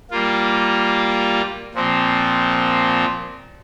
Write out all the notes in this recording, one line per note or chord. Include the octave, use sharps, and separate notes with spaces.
G3 A#3 F4
A#2 F3 C4